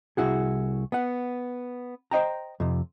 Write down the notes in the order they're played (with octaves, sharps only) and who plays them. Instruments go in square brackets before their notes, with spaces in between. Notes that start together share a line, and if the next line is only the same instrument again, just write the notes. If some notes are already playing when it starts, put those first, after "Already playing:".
[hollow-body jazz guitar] C2 F2 E4 F#4 G#4
B3 F#5
C5 D#5 G5 A#5
F2 C3